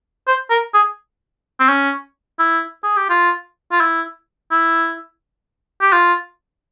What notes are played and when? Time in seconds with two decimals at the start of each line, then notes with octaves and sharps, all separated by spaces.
0.27 C5
0.50 A#4
0.74 G#4
1.60 C4
1.69 C#4
2.39 E4
2.83 G#4
2.96 G4
3.10 F4
3.72 F4
3.80 E4
4.51 E4
5.81 G4
5.92 F4